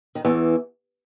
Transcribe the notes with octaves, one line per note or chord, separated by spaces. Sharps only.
D#3
E2 E3